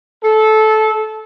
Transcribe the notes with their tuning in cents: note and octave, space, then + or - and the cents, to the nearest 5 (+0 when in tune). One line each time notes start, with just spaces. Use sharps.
A4 -20